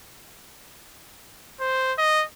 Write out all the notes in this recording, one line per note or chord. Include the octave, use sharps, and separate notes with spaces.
C5
D#5